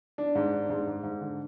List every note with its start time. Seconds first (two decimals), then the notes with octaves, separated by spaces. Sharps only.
0.18 D4
0.35 G#2
0.53 D4
0.70 G#2
0.87 G#2
1.03 G#2
1.21 D3